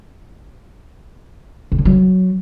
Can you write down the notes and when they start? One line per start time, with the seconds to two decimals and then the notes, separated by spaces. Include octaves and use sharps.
1.72 B2
1.79 D3
1.85 F#3